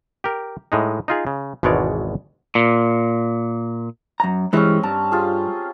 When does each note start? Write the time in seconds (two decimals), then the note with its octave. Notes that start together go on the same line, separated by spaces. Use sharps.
0.24 G4 A#4
0.72 A2 G#3 D#4
1.08 D#4 F4 G#4
1.27 C#3
1.63 G#1 E2 B2 G#3 C#5 D5
2.55 A#2
4.20 F#2 A#5
4.53 G2 E3 G#3 C4 C#4
4.83 G2 A5 A#5
5.12 F4 G4 G#4